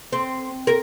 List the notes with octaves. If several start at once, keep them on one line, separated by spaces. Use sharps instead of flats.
C4
A#4